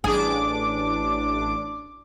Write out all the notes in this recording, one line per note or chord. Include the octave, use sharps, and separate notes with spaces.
A1 D4 G#4 D6